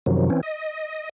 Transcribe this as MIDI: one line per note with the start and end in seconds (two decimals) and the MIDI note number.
0.06 0.30 42
0.06 0.30 48
0.06 0.30 51
0.06 0.30 53
0.06 0.30 54
0.30 0.41 52
0.30 0.41 60
0.30 0.41 61
0.43 1.09 75